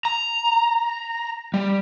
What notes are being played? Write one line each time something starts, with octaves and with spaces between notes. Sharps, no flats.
A#5
G3